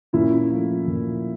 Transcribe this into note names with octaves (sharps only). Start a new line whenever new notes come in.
A#2 C#4 E4
F3 A3
A#2